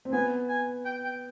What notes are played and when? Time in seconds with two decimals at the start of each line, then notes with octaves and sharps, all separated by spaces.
0.05 C4
0.12 B3 G#5
0.49 G#5
0.85 G5
1.04 G5